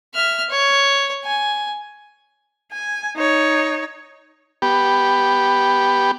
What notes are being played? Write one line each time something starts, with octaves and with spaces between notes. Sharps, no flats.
E5 F6
C#5
G#5
G#5
D#4 C#5
B3 G4